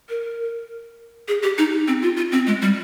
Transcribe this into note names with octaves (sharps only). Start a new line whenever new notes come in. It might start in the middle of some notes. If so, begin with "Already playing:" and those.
A#4
G#4
G4
D#4
C4
F4
F4
C4
G#3
G3